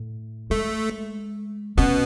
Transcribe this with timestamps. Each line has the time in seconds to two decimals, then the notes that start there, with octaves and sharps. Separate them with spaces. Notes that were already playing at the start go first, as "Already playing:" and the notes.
Already playing: A2
0.50 G#3 A3
1.78 B2 B3 C#4